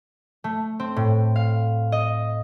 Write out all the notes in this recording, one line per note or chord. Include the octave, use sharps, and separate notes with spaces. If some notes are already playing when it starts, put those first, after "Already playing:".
A3
C4
A2
F5
D#5